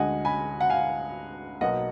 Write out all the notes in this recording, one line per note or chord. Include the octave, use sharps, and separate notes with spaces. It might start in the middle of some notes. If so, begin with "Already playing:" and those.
Already playing: D2 D3 G#3 D#5 F#5 G#5
G#5 B5
F#5
F5 G#5
B1 B2 A#3 D#5 F#5